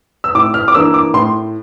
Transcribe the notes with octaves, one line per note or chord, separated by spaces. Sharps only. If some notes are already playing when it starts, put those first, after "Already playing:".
E6
A2 D6
F6
D6
E3 A#3 D4 E6
D6
A2 C6